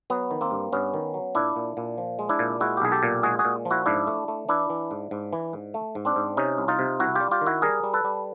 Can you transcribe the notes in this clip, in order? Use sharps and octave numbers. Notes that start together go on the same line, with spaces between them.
F#3 B3
D#3
A#3 C4
G2
G2 B3 C#4
D#3
F#3
A#2 D4 E4
A#2
A#2
F3
G#3
D4 E4
A#2
G#3 E4 F#4
G4
B1 G#4
G4 A4
A#2
G#3 F#4 G#4
F#4 G#4
A#2
F3
E4 F#4
G#2 D4 E4
A3
A3
E3 D4 E4
E3
G#2
G#2
E3
G#2
A3
G#2
C4 D4
G#2
C3 C#4 D#4
C2
D#4 F4
C3
C2 E4 F#4
F4 G4
G3
F4 G4
D#3
E4 F#4
G3 G#4 A#4
G3
A4 B4
G3